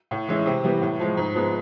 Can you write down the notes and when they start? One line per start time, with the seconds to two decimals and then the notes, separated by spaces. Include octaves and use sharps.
0.11 A2
0.28 E3 G#3 C#4 E4
0.46 C3
0.64 E3 G3 B3
0.82 A2
0.99 F3 G#3
1.17 G#2
1.35 F3 G#3 B3